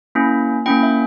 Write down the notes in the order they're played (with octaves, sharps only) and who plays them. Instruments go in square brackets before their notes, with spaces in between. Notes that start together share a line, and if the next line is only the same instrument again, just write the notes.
[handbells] A#3 C#4 E4
A#3 C#4 E4 G5
E5